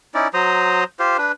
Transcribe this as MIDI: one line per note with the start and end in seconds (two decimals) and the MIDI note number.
0.14 0.28 61
0.14 0.28 63
0.14 0.28 64
0.14 0.28 74
0.34 0.84 54
0.34 0.84 72
0.34 0.84 82
0.34 0.84 87
0.99 1.17 65
0.99 1.17 67
0.99 1.17 72
1.18 1.32 62
1.18 1.32 71